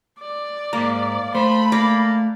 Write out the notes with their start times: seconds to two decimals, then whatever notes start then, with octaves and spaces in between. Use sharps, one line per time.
0.21 D5
0.73 G#2 A#3 A#5
1.35 A3 C5 B5
1.72 A#3 D5